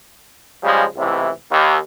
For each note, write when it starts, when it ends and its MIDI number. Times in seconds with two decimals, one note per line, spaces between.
0.63 0.84 49
0.63 0.84 53
0.63 0.84 55
0.63 0.84 56
0.96 1.30 37
0.96 1.30 45
0.96 1.30 48
0.96 1.30 52
1.51 1.76 39